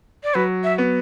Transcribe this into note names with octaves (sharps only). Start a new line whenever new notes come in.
D5
F#3 B4
E5
B3